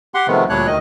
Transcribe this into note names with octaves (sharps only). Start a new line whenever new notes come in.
G4 F#5 C6
C3 D#3 F3 G#3 A3 B3
D2 A#2 G3 D4 C#5 F#6
D2 D#3 D#5